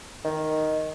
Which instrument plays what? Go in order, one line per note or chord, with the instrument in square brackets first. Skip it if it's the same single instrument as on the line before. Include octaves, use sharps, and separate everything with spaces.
[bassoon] D#3